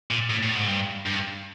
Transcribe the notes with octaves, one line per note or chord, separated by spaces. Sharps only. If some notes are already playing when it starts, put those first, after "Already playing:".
A#2
A2
A2
G#2
G2
G2